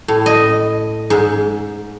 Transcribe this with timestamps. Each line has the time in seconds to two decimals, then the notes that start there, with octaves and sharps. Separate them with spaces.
0.08 A2
0.26 D#5
1.10 G#2